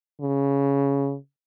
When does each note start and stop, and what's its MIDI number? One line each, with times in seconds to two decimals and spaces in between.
0.21 1.16 49